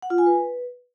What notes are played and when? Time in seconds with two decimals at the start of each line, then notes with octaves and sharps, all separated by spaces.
0.02 F#5
0.10 F4
0.18 G#5
0.26 B4